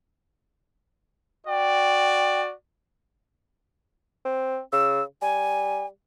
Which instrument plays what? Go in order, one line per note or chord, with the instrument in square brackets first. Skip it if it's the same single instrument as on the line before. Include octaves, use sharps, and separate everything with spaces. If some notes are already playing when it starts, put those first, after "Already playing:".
[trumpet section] F#4 D5 [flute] G5
[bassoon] C4
[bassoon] C#3 [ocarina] E6
[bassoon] G3 [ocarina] G#5